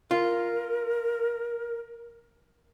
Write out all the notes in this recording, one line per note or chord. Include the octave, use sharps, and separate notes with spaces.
F4 A#4